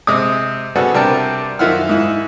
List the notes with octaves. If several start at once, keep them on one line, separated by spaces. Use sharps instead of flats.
C3 G#3 D6 D#6
C#3 G3 B3 F#4 A4
C3 G3 D4 A#4 G5 A5
F#2 D#3 F4 E5 F#5 F6
G#2 E4